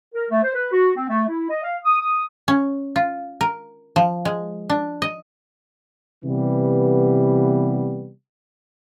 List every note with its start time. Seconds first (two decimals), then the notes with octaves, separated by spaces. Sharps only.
0.14 A#4
0.30 A3
0.43 C5
0.54 B4
0.72 F#4
0.96 C4
1.09 A3
1.29 E4
1.49 D#5
1.64 F5
1.84 D#6
2.01 D#6
2.48 C#4
2.96 F4
3.41 A#4
3.96 F3
4.25 G#3
4.70 D4
5.02 D#5
6.24 C3 E3 G3 B3